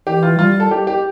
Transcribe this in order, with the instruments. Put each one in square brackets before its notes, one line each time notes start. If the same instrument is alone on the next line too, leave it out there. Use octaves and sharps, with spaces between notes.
[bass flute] E3 [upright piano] G4
[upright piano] F4
[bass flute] G3 [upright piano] F4
[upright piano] A4
G4
G4